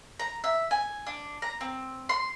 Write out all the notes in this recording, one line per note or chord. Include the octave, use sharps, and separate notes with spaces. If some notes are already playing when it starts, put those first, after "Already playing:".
A#5
E5
G#5
D4
A#5
C4
C6